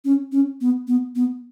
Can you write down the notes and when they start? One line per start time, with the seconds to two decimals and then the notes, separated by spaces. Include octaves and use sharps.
0.05 C#4
0.32 C#4
0.61 B3
0.88 B3
1.16 B3